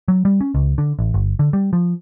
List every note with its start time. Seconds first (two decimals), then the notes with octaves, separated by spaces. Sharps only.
0.08 F#3
0.25 G3
0.41 C#4
0.55 C#2
0.78 D3
0.99 A1
1.14 G1
1.39 D3
1.53 G3
1.73 F3